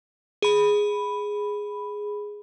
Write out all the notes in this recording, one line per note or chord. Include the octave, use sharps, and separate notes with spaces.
G#4 B5